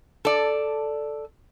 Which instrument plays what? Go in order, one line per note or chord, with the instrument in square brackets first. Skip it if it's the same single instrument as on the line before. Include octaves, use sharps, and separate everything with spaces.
[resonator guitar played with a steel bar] A4 D5